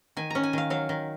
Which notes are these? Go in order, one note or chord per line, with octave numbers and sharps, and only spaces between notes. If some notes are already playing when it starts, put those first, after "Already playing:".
D#3 G#5
C#4 A#5
G#5
D#3 F5
F#3 F5
D#3